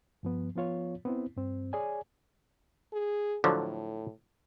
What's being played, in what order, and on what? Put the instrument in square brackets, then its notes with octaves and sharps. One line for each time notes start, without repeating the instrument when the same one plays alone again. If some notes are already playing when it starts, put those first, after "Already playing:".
[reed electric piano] G2 F3 B3
F3 B3 F4 C#5
B3 C4 E4
G2 C4
G#4 C#5 D5 G#5
[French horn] G#4
[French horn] A2 [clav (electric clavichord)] D3 F3 F#3